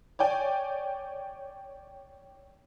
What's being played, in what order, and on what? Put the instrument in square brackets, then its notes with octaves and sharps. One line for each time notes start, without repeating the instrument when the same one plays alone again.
[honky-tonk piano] C#5 D5 G5 G#5